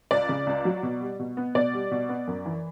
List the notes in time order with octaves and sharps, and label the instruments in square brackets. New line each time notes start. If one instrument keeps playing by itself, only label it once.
[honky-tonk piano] C#2 D5
C#3
C#2
F#3
B2
G3
B2
B3
B2 D5
G3
B2
B3
F#2
E3